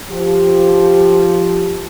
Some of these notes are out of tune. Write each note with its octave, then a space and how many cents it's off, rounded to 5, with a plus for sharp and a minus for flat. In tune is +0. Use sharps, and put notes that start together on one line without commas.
F3 +0 G4 +0